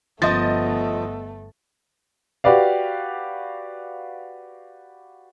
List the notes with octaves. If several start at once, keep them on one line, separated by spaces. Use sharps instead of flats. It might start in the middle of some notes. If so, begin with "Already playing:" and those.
G1 F3 A3 B3 D#5 A6
F#4 G4 B4 D5 F5